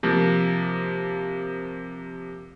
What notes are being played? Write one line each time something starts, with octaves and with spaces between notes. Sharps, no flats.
C3 F3 A#3